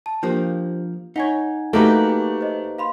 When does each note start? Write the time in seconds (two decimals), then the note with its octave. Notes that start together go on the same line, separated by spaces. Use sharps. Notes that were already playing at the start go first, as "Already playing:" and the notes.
0.06 A5
0.23 F3 A#3 D4 G4 C5
1.16 D#4 C#5 F#5 G#5 G#6
1.73 A3 A#3 D#4 F#4 G4 A4 B4
2.41 C5 D#5
2.79 F5 B5 C6